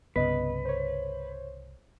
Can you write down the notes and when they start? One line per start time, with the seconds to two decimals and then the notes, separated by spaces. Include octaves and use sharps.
0.16 C2 G2 C#3 B3 B4 D#5
0.65 C5 C#5